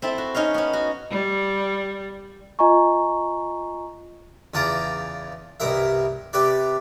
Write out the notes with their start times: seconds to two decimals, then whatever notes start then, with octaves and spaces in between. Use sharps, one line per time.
0.02 C4 E4 A4 E5
0.18 F#4
0.34 C#4 D#4 C#5 F5
0.54 B3 C#4
0.73 F#4
1.11 G3
2.59 F4 D#5 G#5 A#5 C#6
4.54 E2 C#3 F4 A5 A#5 D6
5.60 C2 G2 B2 A#4 E5
6.33 C3 G4 B4 D5 B5